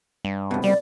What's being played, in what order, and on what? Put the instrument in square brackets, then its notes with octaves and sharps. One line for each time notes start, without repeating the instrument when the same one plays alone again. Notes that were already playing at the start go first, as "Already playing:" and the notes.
[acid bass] G2
[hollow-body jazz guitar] C2 B2
[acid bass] G3 [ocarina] D5